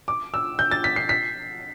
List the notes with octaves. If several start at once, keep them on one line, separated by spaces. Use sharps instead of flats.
D6
E6
G6
A6
B6
C7
B6